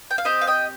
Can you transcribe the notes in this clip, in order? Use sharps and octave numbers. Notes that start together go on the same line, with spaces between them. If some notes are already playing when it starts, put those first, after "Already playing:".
G5
F5
C4 G4 C5 D#5
F5
D#5 G5